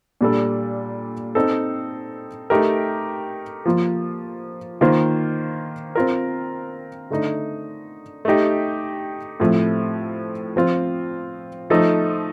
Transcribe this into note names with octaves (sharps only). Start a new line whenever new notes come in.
A#2 G3 D4 A4 D5
C4 D#4 A4
A3 D#4 G4 A#4
F3 A#3 F4
D#3 A#3 F4 C5
C4 F4 A#4
D3 A3 D#4
A3 D#4 G4
A2 F3 A3 C4
F3 C4 F4
F3 A3 D#4 A4